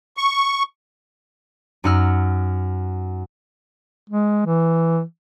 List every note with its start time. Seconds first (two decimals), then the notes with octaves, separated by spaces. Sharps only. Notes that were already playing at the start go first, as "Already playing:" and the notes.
0.17 C#6
1.84 F#2 D#4 F#5 E6 F6
4.09 G#3
4.46 E3